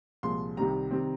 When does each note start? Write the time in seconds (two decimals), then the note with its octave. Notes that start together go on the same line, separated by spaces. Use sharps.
0.23 C2 A#2 F3 G#3 C6
0.57 C2 C3 D#3 G3 C4 A#5
0.91 C3 D#3 G3 C4